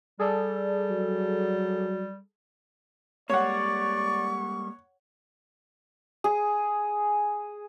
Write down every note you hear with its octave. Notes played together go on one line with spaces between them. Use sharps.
G3 G#4 A4 D5
F#3
G3 G#3 A#3 C#5 D5 F#5 C#6
G#4